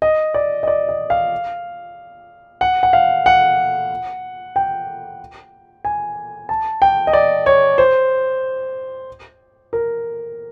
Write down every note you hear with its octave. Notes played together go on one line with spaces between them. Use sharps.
D#5
D5
D#5
D5
D#5
F5
F#5
F#5
F5
F#5
G5
G#5
A5
G5
D#5
D5
C#5
C5
A#4